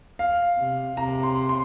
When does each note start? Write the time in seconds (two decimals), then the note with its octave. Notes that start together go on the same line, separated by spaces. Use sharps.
0.19 F5
0.57 C3
0.96 C3 A#5
1.23 C6
1.49 C6